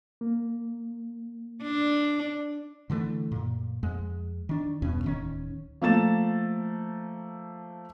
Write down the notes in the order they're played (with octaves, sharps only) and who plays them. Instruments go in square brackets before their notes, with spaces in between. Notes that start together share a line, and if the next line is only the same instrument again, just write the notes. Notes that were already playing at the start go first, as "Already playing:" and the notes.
[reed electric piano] A#3
[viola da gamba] D4
[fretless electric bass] D3 E3 G3 A3
F#2 A#2
F2 G#3
D#3 D4
E2 G2 B2 C#4
D1 D#3 C#4
[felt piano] F3 A3 A#3 A6 E7